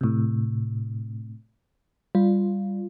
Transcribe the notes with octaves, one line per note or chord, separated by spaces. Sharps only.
A2 C3
G3 F4